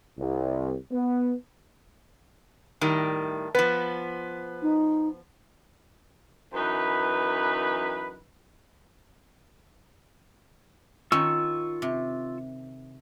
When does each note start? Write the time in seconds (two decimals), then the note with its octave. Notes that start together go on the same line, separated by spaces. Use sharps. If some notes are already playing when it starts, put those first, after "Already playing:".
0.17 C2
0.91 B3
2.81 A2 D#3 G3
3.55 F3 B3 B4
4.62 D#4
6.54 F#2 E3 D#4 B4
11.12 D#3 C#4 F4 C#6 E6
11.82 C3